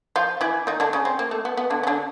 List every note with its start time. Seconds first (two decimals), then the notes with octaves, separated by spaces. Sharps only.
0.16 F3 F4
0.41 E3 E4
0.67 D#3 D#4
0.80 D3 D4
0.93 C#3 C#4
1.05 C4
1.19 A#3
1.31 A3
1.45 B3
1.57 B3
1.70 D3 D4
1.83 C#4
1.87 D3 D4